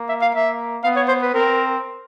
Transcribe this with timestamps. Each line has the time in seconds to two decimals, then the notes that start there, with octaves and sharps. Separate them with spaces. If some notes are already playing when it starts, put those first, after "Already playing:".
Already playing: A#3
0.09 E5
0.22 F5
0.35 A#3 E5
0.84 B3 F5
0.96 C#5
1.08 C5
1.22 B4
1.34 C4 A#4